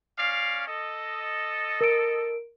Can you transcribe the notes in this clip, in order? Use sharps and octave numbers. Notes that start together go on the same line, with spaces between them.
C#4 D5 F5
A4 D#5
A#4 D7